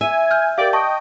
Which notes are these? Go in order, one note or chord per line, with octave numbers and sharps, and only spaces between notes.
E5 G#5
F6 G6
G4 A#4 D5 F5 G5
D#5 G5 A5 C#6